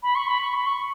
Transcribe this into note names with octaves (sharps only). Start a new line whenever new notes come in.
B5
C#6
B5
C#6
B5
C#6